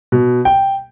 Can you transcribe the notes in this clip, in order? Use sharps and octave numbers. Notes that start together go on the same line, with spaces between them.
B2
G5